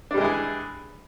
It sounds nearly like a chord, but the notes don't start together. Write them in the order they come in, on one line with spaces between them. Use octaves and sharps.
D4 G3 G#3 E3 G#4